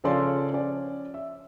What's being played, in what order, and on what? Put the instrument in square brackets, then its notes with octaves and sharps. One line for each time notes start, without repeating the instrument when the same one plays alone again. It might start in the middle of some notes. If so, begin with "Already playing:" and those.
[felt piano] C#3 F3 C#4 A4 D5 C6
C#4 D5
E5